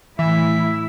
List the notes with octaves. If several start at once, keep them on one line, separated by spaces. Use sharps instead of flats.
A2 E3 E4 E5